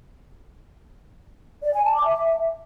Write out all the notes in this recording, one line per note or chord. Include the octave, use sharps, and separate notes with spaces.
D5
G#5
A5
D6
E5